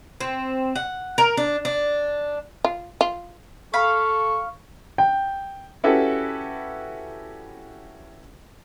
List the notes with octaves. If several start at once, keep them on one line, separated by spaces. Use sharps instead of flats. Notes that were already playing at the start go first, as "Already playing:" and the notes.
C4
F#5
A#4
D4
D4
F4
F4
A4 F5 B5 C#6
G5
C#4 E4 F#4 G4 A4 B4